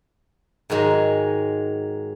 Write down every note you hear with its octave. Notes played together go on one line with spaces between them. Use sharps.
G#2 D#3 F#3 G#3